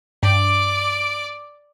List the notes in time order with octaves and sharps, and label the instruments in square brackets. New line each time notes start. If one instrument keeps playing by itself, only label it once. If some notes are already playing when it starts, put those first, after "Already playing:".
[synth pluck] G2 [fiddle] D5 D6